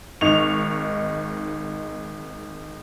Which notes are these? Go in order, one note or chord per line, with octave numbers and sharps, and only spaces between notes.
G#1 D#4 C#6 F7